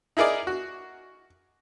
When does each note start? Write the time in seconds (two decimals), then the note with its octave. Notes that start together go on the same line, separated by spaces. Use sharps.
0.17 D#4 E4 G#4 A#4 D5
0.47 F#4